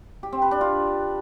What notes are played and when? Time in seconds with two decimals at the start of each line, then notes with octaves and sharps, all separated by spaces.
0.23 G4
0.32 C4
0.42 B4
0.51 D4
0.61 F4